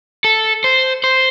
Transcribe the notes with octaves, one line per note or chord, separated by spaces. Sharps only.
A4
C5
C5